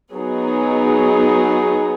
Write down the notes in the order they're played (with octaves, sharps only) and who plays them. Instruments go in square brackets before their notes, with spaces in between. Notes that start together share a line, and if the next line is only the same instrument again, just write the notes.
[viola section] F#3 B3 D#4 G#4